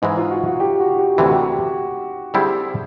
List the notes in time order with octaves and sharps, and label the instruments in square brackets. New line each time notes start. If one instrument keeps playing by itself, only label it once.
[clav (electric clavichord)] G#2 E3 G#3 [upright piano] D#4
[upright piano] F4
F#4
F#4
G4
F#4
F#4
G4
[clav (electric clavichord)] D2 C3 E3 [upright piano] G4
[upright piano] F#4
G4
[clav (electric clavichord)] D3 G3 C4 E4 [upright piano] G#4